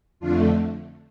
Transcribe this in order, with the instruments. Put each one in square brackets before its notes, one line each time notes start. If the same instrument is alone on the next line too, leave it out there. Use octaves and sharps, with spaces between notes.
[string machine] F2 D3 A3 D4 F4